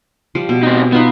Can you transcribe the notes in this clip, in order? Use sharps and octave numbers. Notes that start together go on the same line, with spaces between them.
F3 G3
B2
C4 D#4
B3 D#4 F4 E5